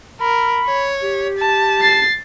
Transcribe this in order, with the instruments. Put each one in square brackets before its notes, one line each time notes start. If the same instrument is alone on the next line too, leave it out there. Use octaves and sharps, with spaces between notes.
[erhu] A#4 [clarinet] B5
[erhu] C#5
[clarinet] G4
[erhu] A5
[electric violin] A6 C7